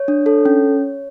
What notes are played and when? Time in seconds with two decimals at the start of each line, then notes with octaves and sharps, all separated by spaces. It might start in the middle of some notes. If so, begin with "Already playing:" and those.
Already playing: C#5
0.08 D4
0.26 A4
0.45 C#4